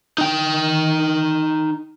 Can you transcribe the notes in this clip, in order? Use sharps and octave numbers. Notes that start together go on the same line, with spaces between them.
D#4 G5